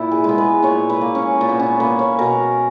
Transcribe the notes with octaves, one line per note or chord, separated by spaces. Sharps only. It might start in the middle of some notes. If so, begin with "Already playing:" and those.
Already playing: A#2 E4
G#4
G#3 B3
B4
A#2 C#5
B4
A#3
C#4
A#2
B3
C#4
A#3 B4
C#5
B2 A#4